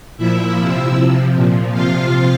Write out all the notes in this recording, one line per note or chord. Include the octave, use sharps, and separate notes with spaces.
A#2 F3 E4 E5
C3 F3
C3 F3
A#2 F3
C3 F3 F4 F5